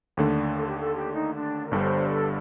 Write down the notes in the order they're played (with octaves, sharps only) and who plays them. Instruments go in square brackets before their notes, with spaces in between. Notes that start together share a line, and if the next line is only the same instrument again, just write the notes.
[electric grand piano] D#2 D3 A3 D4
[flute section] A4
G4
A4
G4
D#4
D4
A#4
[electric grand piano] G1 G2 D3 G3 [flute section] C5
[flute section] A4